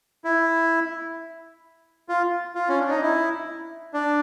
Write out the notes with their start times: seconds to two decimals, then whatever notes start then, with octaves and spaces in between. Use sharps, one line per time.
0.24 E4
2.09 F4
2.55 F4
2.69 C#4
2.80 D4
2.90 D#4
3.02 E4
3.94 D4